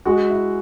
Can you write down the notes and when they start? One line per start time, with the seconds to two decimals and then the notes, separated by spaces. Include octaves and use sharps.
0.05 G#3 F#4
0.30 E4